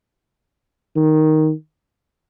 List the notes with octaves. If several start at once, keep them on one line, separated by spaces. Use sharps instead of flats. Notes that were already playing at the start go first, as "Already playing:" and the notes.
D#3